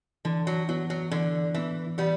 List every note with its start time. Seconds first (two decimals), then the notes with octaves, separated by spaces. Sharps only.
0.25 D3 E3
0.47 F#3
0.69 F#3 B3 E4
0.90 F#3
1.11 D3 E3
1.54 E3 B3 E4
1.98 E3 G3 B3